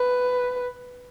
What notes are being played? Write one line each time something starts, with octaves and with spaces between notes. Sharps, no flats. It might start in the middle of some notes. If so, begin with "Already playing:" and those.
Already playing: B4